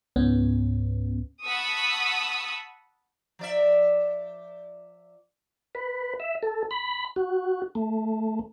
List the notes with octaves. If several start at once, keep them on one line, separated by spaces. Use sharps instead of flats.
C#2 G#2 B3 C#4
F#5 A5 B5 C#6 D#6 E6
F3 D5 E5
B4
E5
A4
B5
F#4
A3